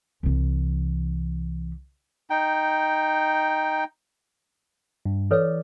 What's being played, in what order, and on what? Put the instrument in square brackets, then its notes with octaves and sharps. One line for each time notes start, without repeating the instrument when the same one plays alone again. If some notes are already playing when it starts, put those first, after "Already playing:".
[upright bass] C2 E3
[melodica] D#4 G5
[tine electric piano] G2
[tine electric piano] E3 D5 [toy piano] A4 B4 C#5